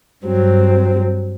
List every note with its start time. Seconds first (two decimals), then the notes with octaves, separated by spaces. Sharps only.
0.24 G2 F#3 C4